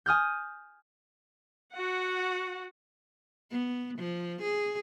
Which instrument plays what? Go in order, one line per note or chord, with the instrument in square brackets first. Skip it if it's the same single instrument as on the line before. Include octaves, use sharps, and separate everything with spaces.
[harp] G#5 D#6 F6 G6
[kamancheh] F#4 F#5
[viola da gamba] B3
F3
G#4